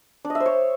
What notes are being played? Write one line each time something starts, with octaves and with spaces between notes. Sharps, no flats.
D4
D#5
E5
C5
C#5